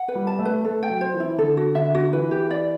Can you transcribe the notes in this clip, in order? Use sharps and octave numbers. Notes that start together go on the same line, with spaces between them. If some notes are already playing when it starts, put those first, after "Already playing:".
Already playing: F#5
B4
G3
A5
A3
B4
A3 A4
G5
F#3
C5
E3
E4
D3 A4
F#4
D3 E5
F#4
E3 B4
G4
D5